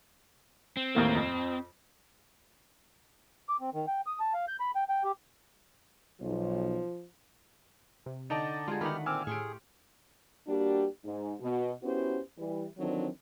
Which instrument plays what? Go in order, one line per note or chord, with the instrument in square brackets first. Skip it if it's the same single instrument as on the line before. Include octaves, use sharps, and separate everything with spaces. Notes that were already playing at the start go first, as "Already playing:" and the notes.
[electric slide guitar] C4
[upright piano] D#2 A2 A#3
F2
[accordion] D6
C4
D#3
G5
D#6
A5
F5
G6
B5
G5
G5
G4
[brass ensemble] B1 [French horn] F3
[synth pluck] C3
[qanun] D3 G5 [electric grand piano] D#4 D#5 A5 [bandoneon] D5
[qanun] G3 F#4 G#4 [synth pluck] G#3 F4
[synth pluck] D#3 D#4 [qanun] A3 F#5 [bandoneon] B3 G4 F6 [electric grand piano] B5
[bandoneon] A#2 C4 D6 [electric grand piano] G#5 E6 F6
[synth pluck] A2 [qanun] G4 C6 C#6 [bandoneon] G#4
[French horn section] G3 A#3 D4 F#4 G4
G#2
B2
B3 C#4 E4 F#4 G4 C5
E3 G3
D3 D#3 F3 F#3 C4 D4